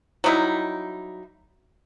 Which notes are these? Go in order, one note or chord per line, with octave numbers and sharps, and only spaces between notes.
F#3 G3 D#4 E4